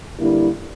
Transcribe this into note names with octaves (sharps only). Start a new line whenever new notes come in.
D3 G3 A#3 E4